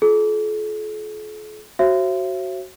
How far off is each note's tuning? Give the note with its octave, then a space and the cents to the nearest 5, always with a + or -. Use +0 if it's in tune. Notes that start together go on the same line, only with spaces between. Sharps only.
F4 +0 A4 -45
F#4 +15 C5 +40 E5 +40